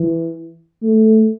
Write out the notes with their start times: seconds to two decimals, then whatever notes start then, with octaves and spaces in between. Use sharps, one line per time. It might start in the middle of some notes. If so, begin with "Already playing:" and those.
Already playing: E3
0.83 A3